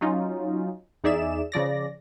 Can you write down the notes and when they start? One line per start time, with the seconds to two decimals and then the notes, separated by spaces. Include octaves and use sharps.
0.01 F#3 C#4 D#4 F4
1.04 E2 D#4 G#4 D5 E5 E7
1.52 C#3 F3 D5 A#6